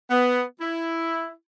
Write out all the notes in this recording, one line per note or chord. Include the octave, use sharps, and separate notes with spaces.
B3
E4